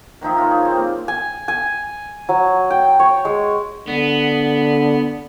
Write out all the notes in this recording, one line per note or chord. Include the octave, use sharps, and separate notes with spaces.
D#3 F3 D#4 E4
F4 C#5
D#4 G#4
C4
A#3
G#5
G#5
F#3
G5
C#5
G#3
D3 B3